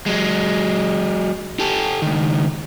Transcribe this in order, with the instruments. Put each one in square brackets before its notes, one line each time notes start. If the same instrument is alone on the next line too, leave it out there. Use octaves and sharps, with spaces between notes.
[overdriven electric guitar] F#3 G#3
G4 A4
C#2 D#3